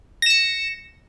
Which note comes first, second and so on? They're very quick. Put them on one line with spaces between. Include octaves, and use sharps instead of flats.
A#6 E7 C#7